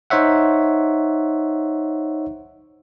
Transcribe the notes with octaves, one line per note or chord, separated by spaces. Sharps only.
D#4 C5 C#5 E5 F#5